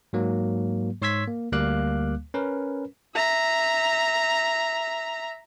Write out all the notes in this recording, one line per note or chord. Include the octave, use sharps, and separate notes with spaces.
G#2 F#3 A#3
G#2 C#5 C6 E6 G#6 B6
A#3
D2 G3 A#3 F5 D6 F#6
C#4 A#4 B4
E5 A#5